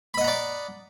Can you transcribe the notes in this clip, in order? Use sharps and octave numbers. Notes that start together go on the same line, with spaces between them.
D5 D#5 F#5 A#5 B5